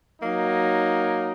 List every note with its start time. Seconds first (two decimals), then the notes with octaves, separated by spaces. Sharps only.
0.22 F#3 A#3 D#4